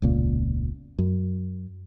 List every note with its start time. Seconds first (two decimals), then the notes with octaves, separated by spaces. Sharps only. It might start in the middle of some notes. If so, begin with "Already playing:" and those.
0.02 E1 C#2 A#2
0.99 F#2